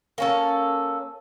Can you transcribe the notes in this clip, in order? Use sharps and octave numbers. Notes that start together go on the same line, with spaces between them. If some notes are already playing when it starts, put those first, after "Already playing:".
A#3 C#4 A4